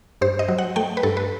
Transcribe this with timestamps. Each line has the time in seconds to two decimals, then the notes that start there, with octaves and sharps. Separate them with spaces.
0.21 G2 C5
0.39 D#5
0.48 F#3
0.58 F#5
0.76 A3 G5
0.97 B4
1.03 G2 A4
1.17 B4